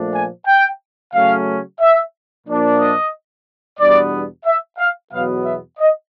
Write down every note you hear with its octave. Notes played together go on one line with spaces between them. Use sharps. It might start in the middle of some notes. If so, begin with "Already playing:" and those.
Already playing: A#2 F3 A3 D4
G#5
G5
C#3 F#3 A3 C#4 F5
E5
A#2 F3 A#3 D4
D#5
E2 B2 G3 B3 D4 D5
E5
F5
E2 B2 F#3 B3 F5
E5
D#5